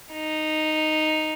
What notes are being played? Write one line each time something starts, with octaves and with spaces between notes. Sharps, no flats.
D#4